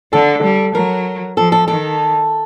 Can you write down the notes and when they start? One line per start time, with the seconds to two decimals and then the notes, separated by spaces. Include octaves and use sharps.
0.13 D3 A4
0.43 G3
0.75 F#3 A#4
1.37 F3 A4
1.52 A4
1.68 D#3 A4